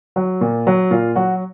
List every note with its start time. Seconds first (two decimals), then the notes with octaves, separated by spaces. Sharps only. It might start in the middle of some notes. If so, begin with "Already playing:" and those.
0.16 F#3
0.41 A#2
0.67 F#3
0.91 A#2 F4
1.15 F#3 F#4